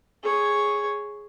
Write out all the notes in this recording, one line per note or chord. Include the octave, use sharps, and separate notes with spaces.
G#4 C#5